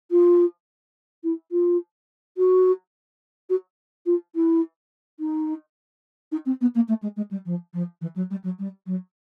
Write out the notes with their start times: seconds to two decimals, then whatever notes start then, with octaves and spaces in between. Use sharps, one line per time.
0.11 F4
1.24 E4
1.52 F4
2.37 F#4
3.49 F#4
4.06 F4
4.35 E4
5.20 D#4
6.32 D#4
6.46 C4
6.61 B3
6.75 A#3
6.88 A3
7.02 G#3
7.16 G#3
7.31 G3
7.46 F3
7.74 F3
8.01 E3
8.16 F#3
8.31 G3
8.44 F#3
8.59 G3
8.86 F#3